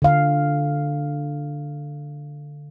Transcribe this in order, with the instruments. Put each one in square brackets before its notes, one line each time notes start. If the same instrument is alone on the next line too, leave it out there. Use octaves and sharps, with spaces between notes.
[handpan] D3 F5